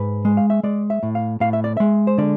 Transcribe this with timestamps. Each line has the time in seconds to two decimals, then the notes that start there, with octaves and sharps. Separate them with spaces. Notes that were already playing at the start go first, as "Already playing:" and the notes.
Already playing: G#2 B4
0.25 G#3
0.37 F5
0.50 E5
0.63 G#3 D5
0.90 E5
1.03 A2
1.15 F5
1.40 A2 F5
1.53 E5
1.64 D5
1.77 G#3 E5
2.07 C5
2.18 D3 D5